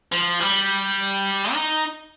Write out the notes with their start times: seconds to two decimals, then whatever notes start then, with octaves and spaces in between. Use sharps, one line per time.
0.12 F3
0.40 G3
1.53 D#4